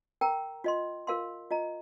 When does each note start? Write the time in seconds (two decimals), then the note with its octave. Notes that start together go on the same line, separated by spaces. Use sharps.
0.21 A#4 G5 A#5
0.64 F4 D#5 C6
1.07 F4 A#4 F5 C6
1.51 F4 D#5 A#5